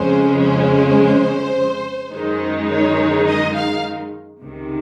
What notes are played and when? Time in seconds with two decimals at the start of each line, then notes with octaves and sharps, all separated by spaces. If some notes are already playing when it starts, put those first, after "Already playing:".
Already playing: F2 C#3 G#3 C#4 C5
0.41 C5
2.13 F#2 D#3 G#3 D#4
2.70 C#5
3.26 D#5
3.55 F5
4.41 C#2 C3 D#3